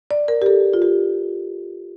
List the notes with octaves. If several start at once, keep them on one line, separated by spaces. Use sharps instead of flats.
D5
A#4
G4
A4
F4
G4